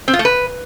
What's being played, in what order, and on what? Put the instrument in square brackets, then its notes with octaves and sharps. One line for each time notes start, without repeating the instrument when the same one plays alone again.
[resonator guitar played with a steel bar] C4
F4
A3
B4